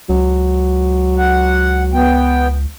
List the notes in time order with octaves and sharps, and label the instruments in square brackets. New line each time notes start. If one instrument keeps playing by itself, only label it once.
[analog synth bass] C#2 [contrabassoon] F#3
[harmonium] F#5
B3 G5